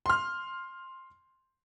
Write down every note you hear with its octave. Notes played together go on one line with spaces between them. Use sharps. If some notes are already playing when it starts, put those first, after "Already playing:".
C6 F6